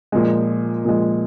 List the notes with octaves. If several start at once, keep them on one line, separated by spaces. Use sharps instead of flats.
A#2 F3 G#3
A#2 F3 G#3